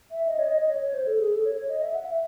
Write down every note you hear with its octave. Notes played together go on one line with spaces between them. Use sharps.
E5
D#5
C#5
D#5
D#5
C#5
C#5
C5
A4
G#4
A4
C#5
C#5
D#5
E5
F#5
E5